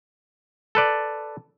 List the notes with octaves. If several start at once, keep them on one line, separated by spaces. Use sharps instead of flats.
A4 B4 D5